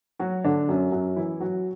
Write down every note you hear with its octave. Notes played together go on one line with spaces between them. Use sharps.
F#3 F#4
D3 D4
F#2 F#3
F#2 F#3
E3 E4
F#3 F#4